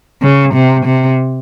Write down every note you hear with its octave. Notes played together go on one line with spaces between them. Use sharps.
C#3
C3
C3